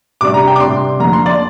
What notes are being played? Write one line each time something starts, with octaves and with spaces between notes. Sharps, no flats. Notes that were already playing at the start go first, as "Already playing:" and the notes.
C3 G3 D4 D6
A#5
G5
D6
C3 G3 D4 C6
F2 D3 A#3 A#5
C6
D5